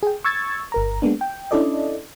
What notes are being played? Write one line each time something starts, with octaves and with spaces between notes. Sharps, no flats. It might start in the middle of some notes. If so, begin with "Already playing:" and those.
G#4 G5
C#6 E6 G#6 A6
G1 A#4 A#5
G#3 A#3 B3 D4
G5
C#4 D4 E4 A4 D5 D#5